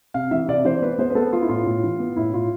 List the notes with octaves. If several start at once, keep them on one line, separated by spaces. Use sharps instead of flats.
C3 F5
E3 E5
C3 D5
E3 C5
B3 B4
B3 C5
B4
B3 A4
B3 F4
E4
A2 F4
A2
E3
B3
A2 E4
A2 F4